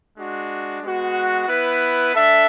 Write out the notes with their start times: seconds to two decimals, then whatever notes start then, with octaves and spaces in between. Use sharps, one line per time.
0.16 G#3 D4 F#4
0.82 G#3 B3 F#4
1.48 B3 E4 B4
2.14 D4 A4 E5